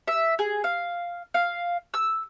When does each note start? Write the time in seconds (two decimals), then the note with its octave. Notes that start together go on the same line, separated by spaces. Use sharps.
0.08 E5
0.39 G#4
0.64 F5
1.34 F5
1.94 E6